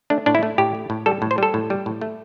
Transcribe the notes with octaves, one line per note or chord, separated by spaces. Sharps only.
A3 D4
A2 D4
E4
A3
A2 G4
A3
A2
G3 A4
A2
C5
G3 A4
A2
G3
A2
A3